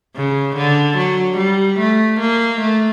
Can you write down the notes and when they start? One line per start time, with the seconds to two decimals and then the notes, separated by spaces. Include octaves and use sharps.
0.16 C#3
0.56 D3
0.98 F#3
1.38 G3
1.80 A3
2.20 A#3
2.61 A3